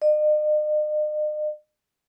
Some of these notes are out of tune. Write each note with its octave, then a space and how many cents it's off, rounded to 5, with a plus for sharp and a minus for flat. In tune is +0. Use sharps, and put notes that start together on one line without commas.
D#5 -45